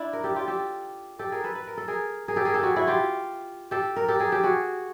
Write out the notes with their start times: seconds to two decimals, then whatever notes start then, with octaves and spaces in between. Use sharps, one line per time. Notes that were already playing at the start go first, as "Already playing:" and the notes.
Already playing: D4 E4
0.13 A#4
0.24 G4 A4
0.36 F4 G4
0.47 G4 A4
1.19 G4 A4
1.32 G#4 A#4
1.44 A4 B4
1.55 B4
1.67 A#4
1.78 A4
1.88 G#4 A#4
2.28 G#4 A#4
2.36 G4 A4
2.45 G#4 A#4
2.54 G4 A4
2.63 F#4 G#4
2.76 E4 F#4
2.87 F4 G4
3.71 G4 A4
3.96 A#4
4.08 G4 A4
4.19 G#4 A#4
4.32 G4 A4
4.43 F#4 G#4